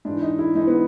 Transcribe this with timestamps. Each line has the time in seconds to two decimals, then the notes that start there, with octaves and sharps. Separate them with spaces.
0.05 G#2 E3 D4
0.22 D#4
0.38 E4
0.55 G#2 E3 D#4
0.67 B3